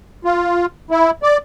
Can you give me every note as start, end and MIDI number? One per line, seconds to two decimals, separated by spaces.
0.25 0.66 65
0.91 1.11 64
1.23 1.37 74